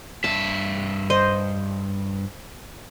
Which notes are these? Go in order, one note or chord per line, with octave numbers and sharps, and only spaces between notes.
G2 E5 A5
C5 D#5